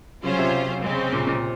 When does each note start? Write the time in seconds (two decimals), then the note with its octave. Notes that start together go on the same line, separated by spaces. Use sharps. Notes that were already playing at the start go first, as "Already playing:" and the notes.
0.23 C#3 F#3 C#4 F4 C5
0.38 C3
0.83 C#3 G#3 C4
1.13 A#2
1.27 A#2